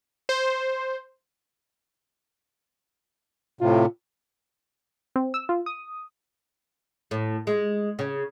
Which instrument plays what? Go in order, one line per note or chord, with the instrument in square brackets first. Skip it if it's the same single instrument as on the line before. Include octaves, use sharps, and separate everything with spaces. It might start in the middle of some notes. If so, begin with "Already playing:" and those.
[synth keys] C5
[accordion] A2 C3 [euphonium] F4
[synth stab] C4
E6
F4
D#6
[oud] A2
G#3
C#3